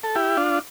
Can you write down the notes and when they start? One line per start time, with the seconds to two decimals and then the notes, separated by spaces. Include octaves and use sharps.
0.03 A4
0.15 E4 G4
0.37 D4 F4